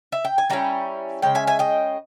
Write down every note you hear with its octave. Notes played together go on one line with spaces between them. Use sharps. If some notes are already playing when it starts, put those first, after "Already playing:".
E5
G5
G#5
G3 C#4 E4 G5 A#5
C#3 G#3 G5
E5 G#5
E5 G#5
D#5 G5